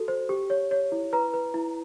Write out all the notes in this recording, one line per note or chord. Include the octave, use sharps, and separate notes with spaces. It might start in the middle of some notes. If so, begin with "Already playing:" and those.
Already playing: F#4 A4
C5
G4
C#5
C#5
E4
B4 A#5
B4
E4